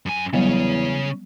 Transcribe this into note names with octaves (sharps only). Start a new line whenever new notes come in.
F#2 G#5
E2 C#3 F#3 G3 B3 C#5